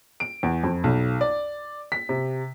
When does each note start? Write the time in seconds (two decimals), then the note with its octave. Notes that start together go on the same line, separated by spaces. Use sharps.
0.20 D7
0.43 E2
0.64 F2
0.84 B1
1.21 D5
1.92 B6
2.09 C3